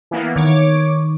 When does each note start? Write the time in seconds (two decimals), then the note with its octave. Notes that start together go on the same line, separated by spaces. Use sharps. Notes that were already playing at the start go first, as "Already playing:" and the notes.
0.11 E3 A#3 B3
0.36 D#3 C#5 D6